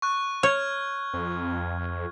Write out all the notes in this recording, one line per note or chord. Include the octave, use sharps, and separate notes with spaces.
C#6 F#6
C#5 F6 G#6
F2